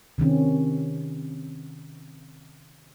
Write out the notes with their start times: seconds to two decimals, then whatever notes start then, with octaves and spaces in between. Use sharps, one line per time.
0.18 C3 D#3 C4 C#4